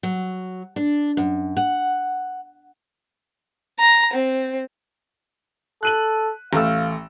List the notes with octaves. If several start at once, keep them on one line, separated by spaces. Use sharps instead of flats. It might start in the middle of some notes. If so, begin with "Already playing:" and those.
F#3
D4
F#2
F#5
A#5
C4
A4 F#6 D#7 F#7
A1 A3 F5 E6